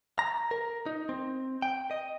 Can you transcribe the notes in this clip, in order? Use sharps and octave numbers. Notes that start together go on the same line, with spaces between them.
A#5
A#4
D#4
C4
G5
D#5